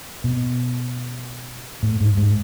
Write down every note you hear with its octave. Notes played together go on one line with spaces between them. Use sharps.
B2
A2
G#2
G#2